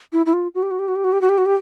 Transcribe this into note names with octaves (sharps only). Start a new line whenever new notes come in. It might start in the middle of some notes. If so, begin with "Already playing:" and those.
E4
E4
F4
F#4
G4
F#4
G4
F#4
G4
F#4
G4
F#4
G4
F#4
G4